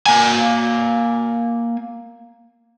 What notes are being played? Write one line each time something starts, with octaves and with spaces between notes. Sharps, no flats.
A#3 G#5